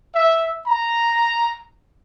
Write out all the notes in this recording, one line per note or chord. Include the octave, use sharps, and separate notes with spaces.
E5
A#5